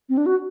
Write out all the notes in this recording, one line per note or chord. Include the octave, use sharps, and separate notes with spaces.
C4
D4
F#4